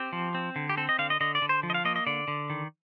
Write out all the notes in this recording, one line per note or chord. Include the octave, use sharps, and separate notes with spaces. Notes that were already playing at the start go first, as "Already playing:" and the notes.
Already playing: C4 G4
F3
C4
D3
G4
C4 A4
D#5
D3 F5
D#5
D3 D#5
D5
D3
C5
F3
D#5
F5
A#3 D#5
D#5
D3 D5
D3
D#3